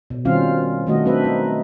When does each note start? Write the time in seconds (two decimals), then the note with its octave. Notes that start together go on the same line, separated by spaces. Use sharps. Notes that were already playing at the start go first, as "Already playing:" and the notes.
0.10 B2
0.25 D#3 G3 C4 C#4 F4 F5
0.87 D#3 A3 F#4 D#5
1.05 F#3 C4 D4 B4 E5
1.24 D#4